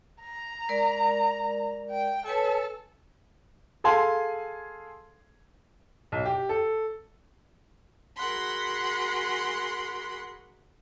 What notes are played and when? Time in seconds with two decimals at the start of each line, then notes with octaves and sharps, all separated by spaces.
0.21 A#5
0.69 G#3 A#4 D5
1.91 G5
2.26 A4 B4 C#5 G#5
3.84 G#4 A4 F5 G#5 C6
6.12 B1
6.26 G4
6.49 A4
8.16 F#4 G#4 A#4 F#5 B5 C6